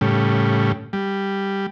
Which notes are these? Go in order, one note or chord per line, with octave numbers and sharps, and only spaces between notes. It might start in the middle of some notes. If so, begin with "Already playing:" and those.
A2 C#3 G3
G3